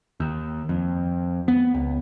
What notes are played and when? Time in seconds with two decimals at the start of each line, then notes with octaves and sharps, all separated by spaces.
0.20 D#2
0.69 F2
1.48 B3
1.74 C#2